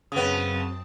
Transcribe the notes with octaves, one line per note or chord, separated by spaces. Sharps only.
F#2 C#3 B3 C4 A5 D#6